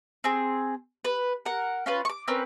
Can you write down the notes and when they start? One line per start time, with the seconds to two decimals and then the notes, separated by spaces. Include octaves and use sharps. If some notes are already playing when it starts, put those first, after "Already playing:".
0.24 C4 G#4
1.05 B4
1.46 A#4 F#5
1.86 C#4 F4 B4
2.05 C#6 D6
2.28 C4 C#4 A#4 B4